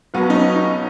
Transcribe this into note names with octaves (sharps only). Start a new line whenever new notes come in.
B1 B2 F#3 B3
D#4
C#4
D#4